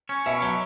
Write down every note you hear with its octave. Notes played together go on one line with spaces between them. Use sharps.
C#4
B2 E5
F#3